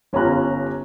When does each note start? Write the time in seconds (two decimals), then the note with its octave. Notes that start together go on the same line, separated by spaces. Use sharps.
0.13 G1 C#4 F4 G4 A#5 F#6